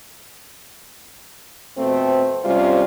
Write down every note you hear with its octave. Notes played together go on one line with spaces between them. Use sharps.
F2 B2 A3 C4
C3 G3 G#3 C4 C#4 F4